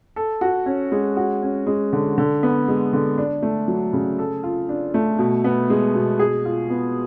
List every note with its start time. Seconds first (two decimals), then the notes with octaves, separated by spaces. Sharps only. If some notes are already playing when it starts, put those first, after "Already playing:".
0.16 A4
0.41 F#4
0.66 C#4
0.92 G#3
1.17 F#4
1.42 C#4
1.67 G#3
1.93 D3
2.18 D3
2.43 B3
2.68 G#3
2.93 D3
3.18 D4
3.42 A3
3.68 F#3
3.93 C#3
4.19 A4
4.43 F4
4.69 D4
4.94 A3
5.19 B2
5.44 B3
5.70 G#3
5.95 B2
6.19 G#4
6.45 F4
6.70 B3